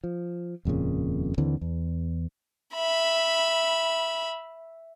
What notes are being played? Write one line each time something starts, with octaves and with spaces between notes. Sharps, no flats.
F3
D#1 F2 A#2 C#3
D#2 D3 E3 C4
E2
E5 B5